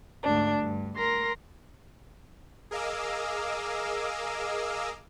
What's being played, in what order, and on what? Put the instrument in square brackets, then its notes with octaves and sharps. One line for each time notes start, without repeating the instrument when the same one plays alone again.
[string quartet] D2 G#2 D4
G2
A#4 C6 A#6
[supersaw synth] G#4 A#4 D#5 F5 D6 E6